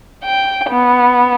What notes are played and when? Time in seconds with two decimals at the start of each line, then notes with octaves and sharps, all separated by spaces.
0.23 G5
0.69 B3